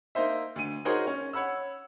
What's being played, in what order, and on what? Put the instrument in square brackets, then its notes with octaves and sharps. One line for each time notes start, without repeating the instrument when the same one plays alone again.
[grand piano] A#3 D#4 C5 E5
D2 D#7
D#4 F#4 G#4 A#4 C5 C#5
C#4
C#5 F#5 B5 E6